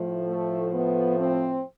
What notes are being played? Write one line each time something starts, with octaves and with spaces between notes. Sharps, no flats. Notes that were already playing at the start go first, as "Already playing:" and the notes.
Already playing: A2 F3
A3
B3
C4